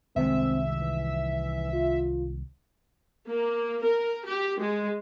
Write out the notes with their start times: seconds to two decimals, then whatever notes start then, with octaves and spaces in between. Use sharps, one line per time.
0.16 C2 D#3 G#3 C4 E5
0.80 E3
1.73 F4
3.28 A#3
3.83 A#4
4.27 G4
4.61 G#3